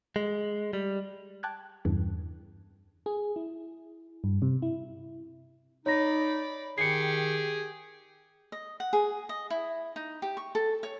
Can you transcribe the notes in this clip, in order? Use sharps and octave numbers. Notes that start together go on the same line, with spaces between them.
G#3
G3
G5 A5 D6 F#6 G#6
E2 G2 C#3 E3
G#4
E4
G2
C3
E4
D#4 C#5 D5 B5 A#6
D#3 G4 G#4 C7 C#7
D#5
F#5
G#4
D#5
E4
D#4
G4
C#6
A4
C#5